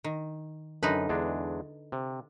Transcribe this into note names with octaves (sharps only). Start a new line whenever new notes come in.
D#3
F#2 D3 D#4 B4
E2 G#3 D4
C3